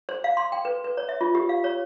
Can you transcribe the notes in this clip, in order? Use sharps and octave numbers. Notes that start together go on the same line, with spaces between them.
C5
F5
C6
G5
B4
B4
C#5
E5
F4
G4
F5
C#5